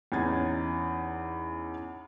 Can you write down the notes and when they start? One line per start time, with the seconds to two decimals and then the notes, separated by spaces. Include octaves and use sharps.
0.12 E2 C#4 D#4 G#6 A6